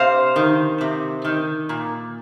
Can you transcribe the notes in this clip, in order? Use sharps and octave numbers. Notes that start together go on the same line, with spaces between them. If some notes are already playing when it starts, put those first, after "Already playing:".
Already playing: C3 C5 F5
D#3
C3
D#3
A#2